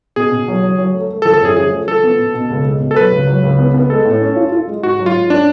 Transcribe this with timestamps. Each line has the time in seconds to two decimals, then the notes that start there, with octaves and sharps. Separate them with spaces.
0.16 B2 G#4
0.32 B2
0.48 F#3
0.63 F#3
0.79 F#3
0.94 A3
1.09 A3
1.22 A4
1.25 F3
1.33 A4
1.41 F#2 G#4
1.56 F3 G#4
1.72 A3
1.87 F3 A4
2.04 B3
2.19 B2
2.35 B2
2.50 C#2
2.65 G#3
2.80 B2
2.91 A4
2.96 F#3 B4
3.12 C#2
3.27 F#3
3.43 C#2
3.59 B3
3.74 B3
3.90 G#3 A4
4.05 A2
4.21 C#4
4.36 F4
4.52 F4
4.67 G#3
4.83 G#2 F#4
4.99 F#3
5.06 F4
5.14 G#2
5.30 C#4 D4